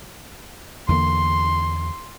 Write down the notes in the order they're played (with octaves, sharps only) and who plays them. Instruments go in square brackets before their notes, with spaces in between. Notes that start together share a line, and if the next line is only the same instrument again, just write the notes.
[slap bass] E2 D3 A#3 [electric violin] C6